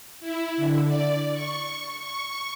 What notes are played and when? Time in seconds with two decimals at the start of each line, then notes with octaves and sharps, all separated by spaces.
0.21 E4
0.57 D3
0.86 D5
1.33 C#6
2.00 C#6